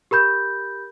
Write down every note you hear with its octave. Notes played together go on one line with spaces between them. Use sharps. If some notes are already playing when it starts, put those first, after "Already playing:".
G4 A#4 B5 G6